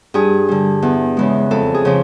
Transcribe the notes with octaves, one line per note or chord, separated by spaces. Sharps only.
G2 G#4
D3 G3
E2
C#3 E3 G#3
F2 A4
G#4
C#3 F3